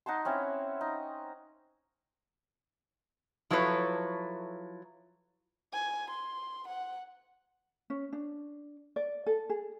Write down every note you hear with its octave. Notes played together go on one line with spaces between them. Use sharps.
D#4 F#5 A5 C6
C4 C#4 E4
D#4
F3 F#3 E4 A4 B4 C#5
G#5
C6
F#5
C#4
D4
D5
A4
G#4